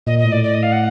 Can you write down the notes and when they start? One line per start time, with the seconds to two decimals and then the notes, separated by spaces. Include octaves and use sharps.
0.06 A#2 D#5
0.19 D#5
0.25 A2
0.32 D5
0.43 D5
0.54 D#5
0.62 F5
0.72 F#5